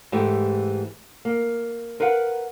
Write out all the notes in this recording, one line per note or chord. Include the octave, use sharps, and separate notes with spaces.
G#2 E3 A3 G4
A#3
A#4 B4 F5 F#5